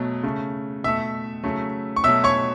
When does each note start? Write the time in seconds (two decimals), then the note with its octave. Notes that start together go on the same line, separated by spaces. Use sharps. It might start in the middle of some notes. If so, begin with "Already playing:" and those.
Already playing: B2 F#3 A3
0.23 C#3 A3
0.84 B2 A3 E5 E6
1.44 C#3 F#3 A3
1.96 C#6
2.04 B2 F#3 A3 E5 E6
2.24 C#5 C#6